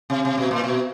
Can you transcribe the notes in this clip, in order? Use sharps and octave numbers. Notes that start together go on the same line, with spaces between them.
C3
C3
B2
A#2
B2